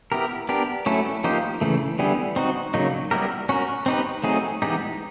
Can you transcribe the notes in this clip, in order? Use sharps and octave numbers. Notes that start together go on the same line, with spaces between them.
B3 E4 G4 A#4
B3 D4 G4 A#4
F#3 A3 C#4 E4 A4
F3 A#3 D#4 G4 C5
C#3 E3 A3
D3 G3 B3 E4 G#4
C4 D#4 F#4
C#3 F#3 A#3 D#4
G3 B3 E4 G4 A#4
C#4 F#4 A#4
C4 D#4 G4 B4
F#3 A3 C4 D#4 G#4
E3 G#3 B3 D#4 G4